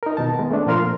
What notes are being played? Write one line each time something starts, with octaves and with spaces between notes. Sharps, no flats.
D#4 A#4
B2 D#3 A5
G#3 B3
A3 C4 D4
A#2 F3 F4 A#4 C6 F6